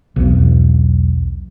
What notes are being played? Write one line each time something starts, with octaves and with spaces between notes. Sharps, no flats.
B1 E2